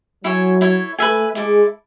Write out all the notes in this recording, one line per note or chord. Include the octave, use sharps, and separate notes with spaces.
F#3 E4 A4 C#5 G#5
E4 A4 C#5
A3 B4 E5 G#5
G#3 E4 A4 D5